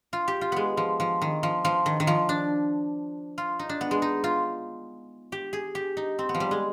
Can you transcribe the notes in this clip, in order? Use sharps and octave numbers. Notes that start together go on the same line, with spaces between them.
F4
G4
F4
G#3 B3
F3
F3
D#3
F3
F3
D#3
D#3
F3
D4
F4
D#4
D4
B3
G#3
D#4
F4
G4
G#4
G4
D#4
C4
B3
F3
G3
G#3